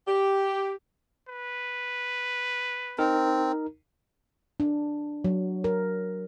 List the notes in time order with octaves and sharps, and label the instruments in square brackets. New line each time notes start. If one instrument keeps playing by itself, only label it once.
[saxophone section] G4
[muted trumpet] B4
[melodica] C4 [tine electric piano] D#4 A#4
[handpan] D4
F#3
A#4